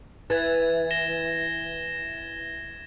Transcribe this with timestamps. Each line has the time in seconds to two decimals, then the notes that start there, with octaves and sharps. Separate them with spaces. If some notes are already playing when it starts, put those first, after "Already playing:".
0.30 E3 G#6 A6
0.91 A#6 E7 G7